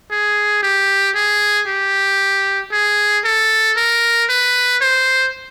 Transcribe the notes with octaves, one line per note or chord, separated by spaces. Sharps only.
G#4
G4
G#4
G4
G#4
A4
A#4
B4
C5